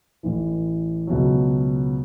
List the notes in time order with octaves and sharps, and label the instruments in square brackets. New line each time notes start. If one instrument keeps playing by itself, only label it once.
[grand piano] A1 A2 E3
C#2 B2 F#3